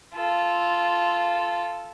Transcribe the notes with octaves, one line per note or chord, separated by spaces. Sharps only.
F4 A4